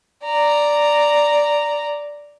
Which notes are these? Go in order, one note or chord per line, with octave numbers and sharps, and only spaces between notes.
D5 A#5